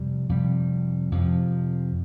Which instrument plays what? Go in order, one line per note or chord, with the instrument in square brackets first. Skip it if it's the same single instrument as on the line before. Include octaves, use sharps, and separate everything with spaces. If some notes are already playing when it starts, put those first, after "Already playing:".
Already playing: [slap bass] F2 C3 G3
F2 C3 G3
F2 C3 F3